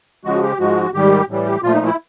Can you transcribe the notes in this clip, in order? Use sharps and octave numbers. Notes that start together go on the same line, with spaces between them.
C#3 F3 G#3 F#4
G4
G#2 F3 G#3 F#4
G#2 D#3 G3 G4
A2 E3 G3
G4
A#2 F3 A3 F4
D#4
E4